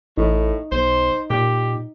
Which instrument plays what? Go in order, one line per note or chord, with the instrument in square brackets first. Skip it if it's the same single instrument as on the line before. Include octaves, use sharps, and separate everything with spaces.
[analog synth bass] A1 [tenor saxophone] A2 [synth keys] D#4
[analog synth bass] B1 [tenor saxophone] C5
[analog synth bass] A#2 [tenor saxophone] G4